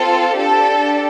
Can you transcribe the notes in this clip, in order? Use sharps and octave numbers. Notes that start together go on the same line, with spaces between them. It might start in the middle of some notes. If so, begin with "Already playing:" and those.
Already playing: C4 F4 A4
D4 G4 A4